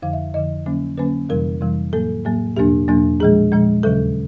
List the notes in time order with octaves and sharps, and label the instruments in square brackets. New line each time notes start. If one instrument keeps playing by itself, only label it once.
[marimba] F2 D3 F3 F5
E5
F2 D3 F3 D#5
D3 F#3 A#3 C#4
D3 F#3 A#3 C#4 B4
F2 C3 E3 G3 A#4
F2 C3 E3 G3
A2 F#3 A#3 A4
A2 F#3 A#3
E2 B2 F#3 A#3 D4 G4
E2 B2 F#3 A#3 D4
A#2 F3 G#3 G#4
A#2 F3 G#3
D#2 C#3 F#3 A4